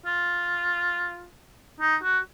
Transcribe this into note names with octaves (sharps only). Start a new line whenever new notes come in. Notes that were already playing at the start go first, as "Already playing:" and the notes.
F4
D#4
F#4